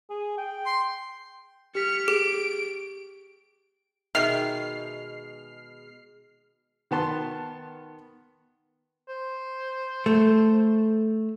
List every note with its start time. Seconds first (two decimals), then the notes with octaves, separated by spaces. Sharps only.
0.10 G#4
0.38 G5
0.66 C6
1.75 G4 F6 B6 C#7
2.08 G4 G#4 D7
4.15 B2 D#3 G#3 F#4 E5 F6 C7
6.91 D#3 B3 A5 C6
9.09 C5
10.06 A3